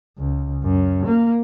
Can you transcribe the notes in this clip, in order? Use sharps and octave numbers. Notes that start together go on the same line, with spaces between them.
C#2
F#2
A#3